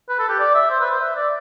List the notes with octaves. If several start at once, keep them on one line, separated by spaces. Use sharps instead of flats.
B4
A4
G4
D5
E5
C5
B4
C5
E5
D5